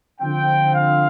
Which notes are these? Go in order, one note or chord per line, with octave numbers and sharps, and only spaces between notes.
D3 F3 C4 G5
F5